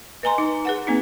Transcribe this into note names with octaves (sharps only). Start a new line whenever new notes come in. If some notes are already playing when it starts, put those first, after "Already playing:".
B4 D#5 G#5 A#5 C6
D#4
G#4 B4 F#5
A#3 C4 D#4